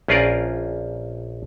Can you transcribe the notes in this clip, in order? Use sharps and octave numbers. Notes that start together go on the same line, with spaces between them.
A#1 C#4 F4 G#4 A#4 D5